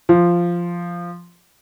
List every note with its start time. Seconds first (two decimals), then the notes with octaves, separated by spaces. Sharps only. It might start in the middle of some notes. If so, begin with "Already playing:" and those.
0.09 F3